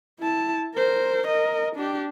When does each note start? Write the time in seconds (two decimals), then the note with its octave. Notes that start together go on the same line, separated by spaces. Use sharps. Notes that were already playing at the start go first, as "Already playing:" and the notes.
0.20 E4 A5
0.75 A#4 C5
1.27 A#4 D#5
1.75 D4 G4